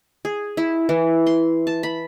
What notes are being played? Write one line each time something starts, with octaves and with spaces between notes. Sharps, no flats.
G#4
E4
E3
C6
A5
B5